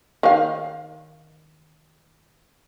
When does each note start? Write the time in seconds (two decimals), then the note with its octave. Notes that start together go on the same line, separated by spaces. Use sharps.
0.23 D#3 F5